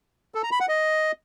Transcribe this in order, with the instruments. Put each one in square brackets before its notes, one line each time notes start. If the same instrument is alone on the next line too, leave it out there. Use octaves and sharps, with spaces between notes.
[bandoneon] A4
A#5
B5
F#5
D#5